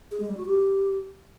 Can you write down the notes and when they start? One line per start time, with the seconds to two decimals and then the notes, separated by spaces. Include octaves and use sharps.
0.11 G#4
0.20 G#3
0.29 G3
0.37 F#4
0.46 G4